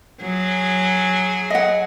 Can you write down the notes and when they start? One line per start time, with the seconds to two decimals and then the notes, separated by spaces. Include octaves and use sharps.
0.22 F#3 G#4
1.50 D#5 F#5